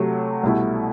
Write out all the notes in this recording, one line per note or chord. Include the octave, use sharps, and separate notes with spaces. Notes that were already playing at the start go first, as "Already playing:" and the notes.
Already playing: C3 F#3 A3
C2 B2 A3 E4